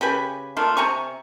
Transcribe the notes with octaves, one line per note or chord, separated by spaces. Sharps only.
C#3 G4 B4 G#5
A3 A#3 D4 F4
C3 G#5 A#5 C#6